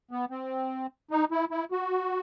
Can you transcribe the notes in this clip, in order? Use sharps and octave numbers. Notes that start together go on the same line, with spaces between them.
B3
C4
D#4
E4
E4
F#4